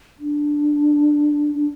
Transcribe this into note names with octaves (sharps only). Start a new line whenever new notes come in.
D4
D4